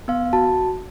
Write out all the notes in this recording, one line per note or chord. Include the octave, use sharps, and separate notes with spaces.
B3 F5
F#4 A5